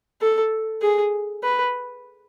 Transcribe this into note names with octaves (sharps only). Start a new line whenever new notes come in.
A4
G#4
B4